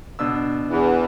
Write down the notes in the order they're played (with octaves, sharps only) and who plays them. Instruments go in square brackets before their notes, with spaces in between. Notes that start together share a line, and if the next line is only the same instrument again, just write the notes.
[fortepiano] B2 D4 E6
[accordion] E2 E3